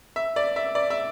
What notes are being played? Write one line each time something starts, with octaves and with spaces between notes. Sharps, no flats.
E5
D5
E5
D5
E5